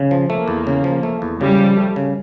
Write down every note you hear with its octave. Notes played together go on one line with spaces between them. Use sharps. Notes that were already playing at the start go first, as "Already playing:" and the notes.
Already playing: C#3
F3
A3 A#3
E2
C#3
F3
A3
E2
C#3 G3
F3
A3
C#3